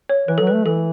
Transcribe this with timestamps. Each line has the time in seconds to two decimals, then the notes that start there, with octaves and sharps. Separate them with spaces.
0.09 C#5
0.28 E3 B4
0.38 F#3 A4
0.47 B4
0.53 A3
0.65 E3 A4